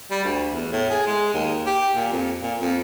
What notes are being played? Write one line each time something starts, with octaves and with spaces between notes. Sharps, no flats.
G3
D2
E2
A2
G#4
G#3
D#2
G4
A#2
F2
A#2
F2